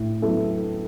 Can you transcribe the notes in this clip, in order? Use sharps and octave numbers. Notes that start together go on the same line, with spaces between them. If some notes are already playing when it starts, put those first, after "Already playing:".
Already playing: A2
F#3 B3 E4 A4